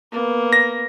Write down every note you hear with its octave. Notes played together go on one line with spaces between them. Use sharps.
A#3 B3
A#6